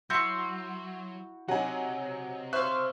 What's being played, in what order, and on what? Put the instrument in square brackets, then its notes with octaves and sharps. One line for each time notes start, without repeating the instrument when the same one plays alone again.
[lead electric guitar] F#3 [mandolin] E4 F#4 [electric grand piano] C6 G6
[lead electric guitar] C3 [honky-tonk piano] F#3 D#4 [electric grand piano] F#5 G#5
[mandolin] C5 F5 [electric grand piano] E5 C#6 F#6